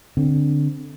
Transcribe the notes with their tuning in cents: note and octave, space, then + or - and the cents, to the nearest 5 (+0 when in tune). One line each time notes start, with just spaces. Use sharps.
D3 +0 C4 +5